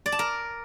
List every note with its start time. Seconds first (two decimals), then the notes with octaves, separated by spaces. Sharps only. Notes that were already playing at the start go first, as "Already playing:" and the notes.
0.06 D5
0.12 A5
0.19 A#4